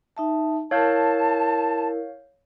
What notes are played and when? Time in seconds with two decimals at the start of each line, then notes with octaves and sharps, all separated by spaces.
0.17 D#4 E5 A5
0.71 E4 A#4 C#5 F5 A5 G6